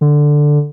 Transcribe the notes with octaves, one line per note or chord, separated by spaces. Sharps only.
D3